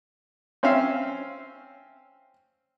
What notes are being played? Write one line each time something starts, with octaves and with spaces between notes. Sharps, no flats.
C4 C#4 E5 F5